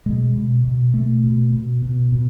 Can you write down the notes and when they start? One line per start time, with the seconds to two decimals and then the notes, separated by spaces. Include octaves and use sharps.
0.06 B2 G#3
0.35 B2
0.64 B2
0.94 B2 A3
1.24 B2
1.53 B2
1.82 B2
2.12 B2